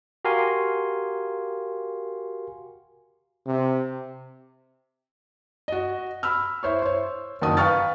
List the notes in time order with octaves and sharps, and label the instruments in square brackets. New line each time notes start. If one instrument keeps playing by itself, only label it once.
[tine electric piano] F#4 G4 A#4 F5 G#5 C6
[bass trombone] C3
[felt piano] F#4 D#5
B5 E6 F6
E4 C5 C#5 C#6
C5 C#5
F#1 D#3 F#4 A5 D#6
B4 F5 G5 C#6 F6 A6